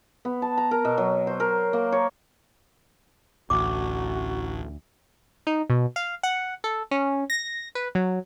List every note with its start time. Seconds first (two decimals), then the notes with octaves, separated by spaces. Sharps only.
0.25 B3
0.42 A5
0.58 A#5
0.71 A#4
0.85 B2
0.98 F#3
1.27 C5
1.40 A#4
1.73 A#3
1.92 C#5
3.50 A1 D2 F#4 D6
5.47 D#4
5.70 B2
5.96 F5
6.23 F#5
6.64 A4
6.91 C#4
7.30 A#6
7.75 B4
7.95 F#3